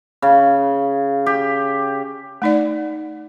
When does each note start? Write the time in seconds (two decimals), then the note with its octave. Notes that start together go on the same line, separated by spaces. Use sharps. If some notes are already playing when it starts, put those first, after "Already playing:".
0.22 C#3
1.26 G4
2.42 A3 D#4 D5